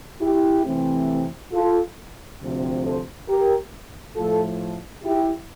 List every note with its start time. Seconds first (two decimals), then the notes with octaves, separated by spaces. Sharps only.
0.21 E4 G4
0.65 C3 E3 A3 C4
1.53 F4 A4
2.41 D2 C3 F3 C4
2.85 A4 C5
3.28 G4 A#4
4.16 A2 F3 A3 F4 A4
5.04 E4 G4